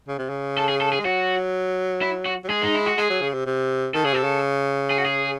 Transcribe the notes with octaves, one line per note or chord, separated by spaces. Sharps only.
C#3
C3
C#3
A4
G#4
A4
G#4
G#3
F#3 F#4
E4
F#4
F#3
G#3 G#4
D#4
E4
F#4
G#3 G#4
F#3
C#3
C3
C3
D#3 A4
C#3 G#4
C3 A4
C#3
G#4
F#4
G#4